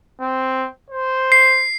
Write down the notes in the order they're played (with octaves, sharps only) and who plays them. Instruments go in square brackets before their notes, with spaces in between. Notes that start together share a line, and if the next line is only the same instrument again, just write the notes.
[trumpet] C4
C5
[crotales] C7